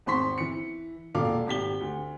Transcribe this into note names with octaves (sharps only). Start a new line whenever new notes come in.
G#1 E2 C4 C6 C#6 B6
E3 C#7
E1 A#2 A#3 A4 F5 D6
G#1 G4 B6 G7
D2